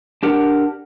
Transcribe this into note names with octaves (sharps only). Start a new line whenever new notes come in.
D4 G4 A#4 F#5